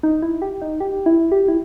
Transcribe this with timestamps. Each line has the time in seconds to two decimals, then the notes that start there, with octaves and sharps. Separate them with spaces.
0.03 D#4
0.22 E4
0.42 G4
0.62 D#4
0.80 G4
1.06 E4
1.32 G4
1.48 E4